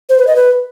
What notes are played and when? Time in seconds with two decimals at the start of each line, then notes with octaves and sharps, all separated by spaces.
0.09 C5
0.18 B4
0.27 D#5
0.36 B4